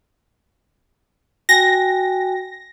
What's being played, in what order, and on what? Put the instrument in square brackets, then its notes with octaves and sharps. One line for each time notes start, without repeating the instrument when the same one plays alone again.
[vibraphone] F#4 G5 G#5 [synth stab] A#6